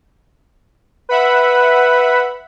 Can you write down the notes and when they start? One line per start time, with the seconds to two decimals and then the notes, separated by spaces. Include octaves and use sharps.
1.10 B4 E5 F#5 B5